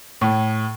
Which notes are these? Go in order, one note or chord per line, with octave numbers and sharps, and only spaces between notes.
A2